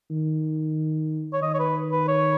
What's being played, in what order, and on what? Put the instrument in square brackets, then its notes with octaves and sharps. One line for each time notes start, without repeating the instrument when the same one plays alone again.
[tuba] D#3
[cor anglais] C#5
[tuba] D#3 [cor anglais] D#5
[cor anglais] C#5
B4
B4
C#5